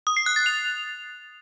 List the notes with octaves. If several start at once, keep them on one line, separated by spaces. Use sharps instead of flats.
D#6
C7
F#6
A6
F7